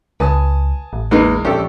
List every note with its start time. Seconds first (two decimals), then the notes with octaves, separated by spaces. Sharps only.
0.20 C#2 B4 G#5 A5 D#6
0.93 A1
1.11 E2 G#3 A#3 D#4 B4
1.45 A#1 C#4 G4 A4